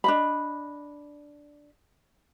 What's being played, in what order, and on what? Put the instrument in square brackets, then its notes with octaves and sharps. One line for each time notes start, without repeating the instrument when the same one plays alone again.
[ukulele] D4 D#5 B5